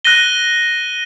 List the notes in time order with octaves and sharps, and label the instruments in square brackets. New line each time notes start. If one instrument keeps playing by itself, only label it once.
[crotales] F#6 A#6 D#7 G7